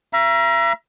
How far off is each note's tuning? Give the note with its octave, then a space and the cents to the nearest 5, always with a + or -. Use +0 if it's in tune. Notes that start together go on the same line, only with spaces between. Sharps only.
E5 +40 A#5 +30